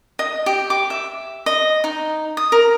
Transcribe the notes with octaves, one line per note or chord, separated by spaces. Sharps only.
D#5
G4
D6
E5
D#5
D#4
D#6
A#4